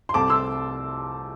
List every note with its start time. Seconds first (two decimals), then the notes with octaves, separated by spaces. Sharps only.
0.09 C6
0.14 C2 C3 A3 C4 A5 D6
0.30 C6 E6